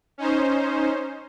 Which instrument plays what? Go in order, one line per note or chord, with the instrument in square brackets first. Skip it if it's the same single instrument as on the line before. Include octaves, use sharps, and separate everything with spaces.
[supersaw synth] C#4 D#4 C5